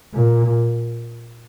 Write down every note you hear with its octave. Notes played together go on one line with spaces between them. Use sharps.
A#2